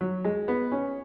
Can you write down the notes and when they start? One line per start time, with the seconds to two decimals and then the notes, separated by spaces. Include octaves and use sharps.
0.01 F#3
0.25 G#3
0.48 B3
0.72 C#4